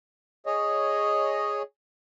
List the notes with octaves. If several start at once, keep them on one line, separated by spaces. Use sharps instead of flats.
G#4 C#5 D#5